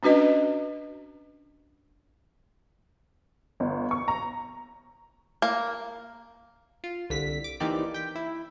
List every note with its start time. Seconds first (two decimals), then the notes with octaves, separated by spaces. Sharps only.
0.03 C#4 D4 F#4 B4 D#5
3.60 G1
3.91 C#6
4.08 A#5
5.42 A#3
6.84 F4
7.10 C2 D3 B6
7.44 D6
7.60 E3 A#3 C4 D#4 G4 D5
7.94 G5 B6
8.16 E4